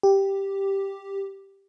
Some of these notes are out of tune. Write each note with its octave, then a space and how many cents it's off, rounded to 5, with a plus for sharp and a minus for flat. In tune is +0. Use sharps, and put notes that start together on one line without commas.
G4 +0